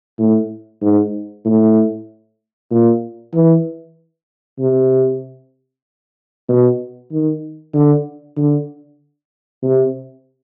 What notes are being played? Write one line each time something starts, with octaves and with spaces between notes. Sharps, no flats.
A2
G#2
A2
A#2
E3
C3
B2
D#3
D3
D3
C3